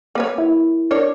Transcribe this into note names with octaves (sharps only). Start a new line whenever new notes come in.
A#3 B4 C#5
E4
D4 A#4 C#5